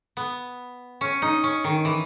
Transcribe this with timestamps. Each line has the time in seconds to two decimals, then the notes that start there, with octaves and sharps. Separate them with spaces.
0.17 B3
1.01 C#4
1.22 D#4
1.44 C#4
1.64 D#3
1.85 E3